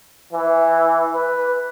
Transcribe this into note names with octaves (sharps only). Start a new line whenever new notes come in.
E3
B4